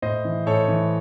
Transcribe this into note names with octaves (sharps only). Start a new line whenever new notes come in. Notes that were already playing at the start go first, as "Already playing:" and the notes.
A2 C5 D#5
E3
A2 A4 C#5
E3